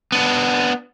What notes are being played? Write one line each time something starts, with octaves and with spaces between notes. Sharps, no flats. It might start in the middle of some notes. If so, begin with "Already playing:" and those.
B3 D4